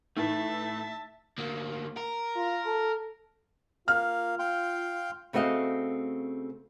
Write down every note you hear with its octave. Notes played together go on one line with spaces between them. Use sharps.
A2 E3 A3 D#4 E5 A5
D2 A#3
A#4
F4
A4
A#3 F4 F5 F6
F5 G5 C6
C#3 A3 C4 F#4 D#5 F5